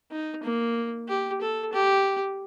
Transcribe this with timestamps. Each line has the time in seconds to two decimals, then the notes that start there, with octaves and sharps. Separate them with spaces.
0.12 D#4
0.43 A#3
1.08 G4
1.41 A4
1.73 G4